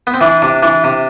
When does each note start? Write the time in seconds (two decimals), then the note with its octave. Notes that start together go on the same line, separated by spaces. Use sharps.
0.07 B3
0.14 C4
0.21 E3 D4
0.42 C3 D4
0.63 E3 D4
0.84 C3